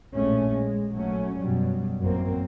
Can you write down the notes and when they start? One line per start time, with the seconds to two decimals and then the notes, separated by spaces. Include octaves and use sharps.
0.13 A#1 A2 G#3 A3 C#4
0.47 G#3
0.93 A#1 F#3 A3 C#4
1.39 F#2 B2 F#3 G3
1.99 A1 F#2 A#3 C4